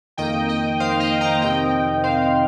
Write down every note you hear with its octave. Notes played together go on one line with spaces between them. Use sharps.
F2 D#3 A#3 D#5 G5
D#5 G5
C5 F5
D#5 G5
F5 A#5
A#5
F2 C3 D#3 C4 D#5 G5
C5 F5